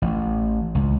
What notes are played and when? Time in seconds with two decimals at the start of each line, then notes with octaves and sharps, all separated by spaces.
0.02 A1
0.75 C#2